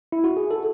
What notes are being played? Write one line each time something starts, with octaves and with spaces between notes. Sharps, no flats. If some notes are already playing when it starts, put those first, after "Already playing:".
E4
F#4
G#4
A4